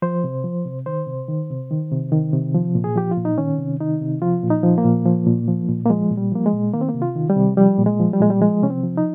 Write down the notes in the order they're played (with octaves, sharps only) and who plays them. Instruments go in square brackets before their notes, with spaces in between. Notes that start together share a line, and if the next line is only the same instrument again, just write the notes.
[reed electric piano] F3 C5
C3
F3
C3
D#3 C5
C3
D#3
C3
D#3
C3
D#3
C3
F3
A#2
G#4
F3 G4
F4
A#2
D#4
D#3 C#4
C3
D#3 D#4
C3
F3 F4
A#2
D#4
F3
A#3
A#2
F3
A#2
F3
A#2
A#3
F3 G#3
A#2
G3
F3 A#3
G#3
A#2
D#3 A#3
C4
A#3
C3
F4
D#3
G3
C3
F3 G3
A#2
G#3
F3
G3
A#2 G#3
G3
F3 G#3
C3 C#4
C4
F3
D#4